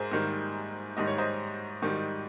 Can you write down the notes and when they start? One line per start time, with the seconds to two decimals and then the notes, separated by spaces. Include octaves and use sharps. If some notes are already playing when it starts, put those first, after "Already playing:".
Already playing: G#2 G#4 A#4 C5
0.11 G#2 D#3 G3
0.97 G#2 D#3 G3 D#5
1.07 C#5
1.18 C5 D#5
1.82 G#2 D#3 G3